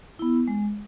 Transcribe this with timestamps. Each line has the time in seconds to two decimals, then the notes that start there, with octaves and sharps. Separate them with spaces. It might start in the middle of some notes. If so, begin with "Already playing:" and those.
0.19 B3 E4
0.48 G#3